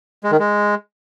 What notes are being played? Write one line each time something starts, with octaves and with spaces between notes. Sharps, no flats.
G#3
D#3
G#3